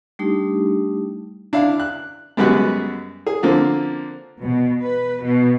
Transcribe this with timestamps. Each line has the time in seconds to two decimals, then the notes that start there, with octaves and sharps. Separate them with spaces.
0.19 G3 A3 D4 D#4 G4
1.53 D4 E4 F5
1.80 F#6
2.37 F#2 G3 G#3 B3 F#4 F#6
3.26 G#4
3.43 D3 F3 A#3 C4
4.41 B2
4.81 B4
5.23 B2